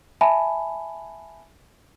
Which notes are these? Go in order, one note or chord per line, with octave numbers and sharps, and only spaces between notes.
E5 G#5 A5 B5